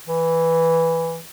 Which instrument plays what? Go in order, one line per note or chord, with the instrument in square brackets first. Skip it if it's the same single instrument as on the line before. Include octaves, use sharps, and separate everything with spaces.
[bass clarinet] E3